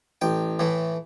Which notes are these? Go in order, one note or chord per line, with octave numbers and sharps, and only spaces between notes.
A1 G5
A2 E3 A3